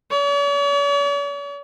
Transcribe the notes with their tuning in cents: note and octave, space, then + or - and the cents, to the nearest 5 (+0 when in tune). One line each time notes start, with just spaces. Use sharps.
C#5 +45